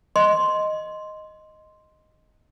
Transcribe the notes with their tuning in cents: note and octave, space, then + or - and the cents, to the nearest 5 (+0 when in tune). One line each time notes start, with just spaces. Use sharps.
D#5 +0 C6 +0